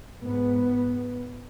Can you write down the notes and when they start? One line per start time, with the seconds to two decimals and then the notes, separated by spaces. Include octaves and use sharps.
0.23 G#2 B3